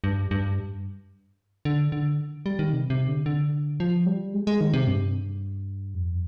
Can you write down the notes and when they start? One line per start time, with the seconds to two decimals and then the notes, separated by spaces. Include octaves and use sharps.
0.04 G2
0.31 G2
1.65 D3
1.92 D3
2.46 G3
2.59 D#3
2.73 C3
2.90 C3
3.08 D3
3.26 D3
3.80 F3
4.06 G3
4.34 G#3
4.47 G#3
4.61 D#3
4.73 C3
4.87 G2
5.95 F2